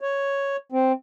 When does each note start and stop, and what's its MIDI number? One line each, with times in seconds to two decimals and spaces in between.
0.01 0.57 73
0.72 0.92 60